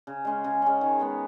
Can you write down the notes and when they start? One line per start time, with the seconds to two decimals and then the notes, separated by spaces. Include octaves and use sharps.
0.07 C#3
0.25 G#3 C#4
0.44 C#3
0.62 G#3 C#4
0.81 D#3
0.99 G#3 B3